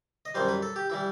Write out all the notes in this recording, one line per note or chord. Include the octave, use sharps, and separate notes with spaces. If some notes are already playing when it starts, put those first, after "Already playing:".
D#5
F#2 E3 G3 C5
B4
A4
G4
E3 G3 E4